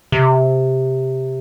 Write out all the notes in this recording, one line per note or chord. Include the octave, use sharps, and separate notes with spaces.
C3